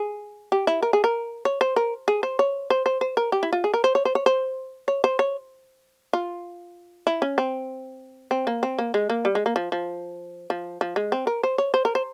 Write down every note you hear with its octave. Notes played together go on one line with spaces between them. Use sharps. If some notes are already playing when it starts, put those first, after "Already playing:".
Already playing: G#4
G4
E4
A#4
G#4
A#4
C#5
C5
A#4
G#4
C5
C#5
C5
C5
C5
A#4
G4
E4
F4
G#4
A#4
C5
C#5
C5
C#5
C5
C#5
C5
C#5
F4
E4
C#4
C4
C4
A#3
C4
A#3
G#3
A#3
G3
G#3
A#3
F3
F3
F3
F3
G#3
C4
A#4
C5
C#5
C5
A#4
C5